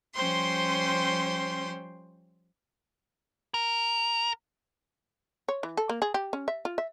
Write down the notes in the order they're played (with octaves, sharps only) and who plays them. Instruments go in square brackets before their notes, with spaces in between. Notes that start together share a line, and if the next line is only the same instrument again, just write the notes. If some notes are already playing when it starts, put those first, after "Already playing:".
[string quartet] F3 G3 C#4 C5 G5 C6
[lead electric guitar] A#4
[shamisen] C#5
E3
A4
A#3
G#4
G4
C#4
E5
F4
E5